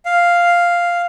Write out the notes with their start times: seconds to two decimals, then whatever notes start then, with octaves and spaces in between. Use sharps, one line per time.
0.05 F5